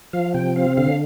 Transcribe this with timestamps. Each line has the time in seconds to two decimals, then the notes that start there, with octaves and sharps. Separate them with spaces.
0.13 F3 F5
0.34 C3 G5
0.56 C4 F5
0.77 D3 F5